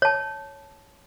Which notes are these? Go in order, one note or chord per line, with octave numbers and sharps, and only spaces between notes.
C#5 A5